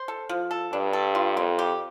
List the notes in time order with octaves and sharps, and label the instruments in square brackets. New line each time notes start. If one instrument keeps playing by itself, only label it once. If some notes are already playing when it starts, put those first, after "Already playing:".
Already playing: [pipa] C5
A4
F3
A4
[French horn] G2 [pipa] D4
[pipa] A4
F4
[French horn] F2 [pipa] C4
[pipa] G4